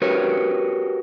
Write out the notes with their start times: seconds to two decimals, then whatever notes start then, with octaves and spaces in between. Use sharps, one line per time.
0.02 F#4 G4 A#4 B4 C#5